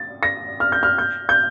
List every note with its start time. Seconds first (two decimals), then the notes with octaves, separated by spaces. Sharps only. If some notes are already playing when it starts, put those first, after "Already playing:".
Already playing: A6
0.23 A#6
0.60 F6
0.72 G6
0.83 F6
0.98 G6
1.29 G6